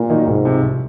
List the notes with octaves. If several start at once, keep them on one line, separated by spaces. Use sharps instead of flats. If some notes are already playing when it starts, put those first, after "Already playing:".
Already playing: A#2
D#3 F#3 A#3 D#4
C2 G#2
C3 F3
C2